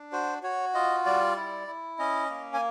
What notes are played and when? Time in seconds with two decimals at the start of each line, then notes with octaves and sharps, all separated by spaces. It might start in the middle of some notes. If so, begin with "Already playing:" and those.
Already playing: D4
0.12 F#4 C5
0.43 F#4 C#5
0.74 F4 D#5
1.06 G3 D5
1.36 E4
1.67 E4
1.99 C#4 D#5
2.30 A#3
2.54 G#5